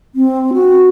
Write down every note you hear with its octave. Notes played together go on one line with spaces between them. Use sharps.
C4
F#4